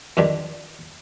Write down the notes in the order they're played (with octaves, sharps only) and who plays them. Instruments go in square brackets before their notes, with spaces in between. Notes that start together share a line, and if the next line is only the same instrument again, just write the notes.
[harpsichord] F2 D3 D#3 G3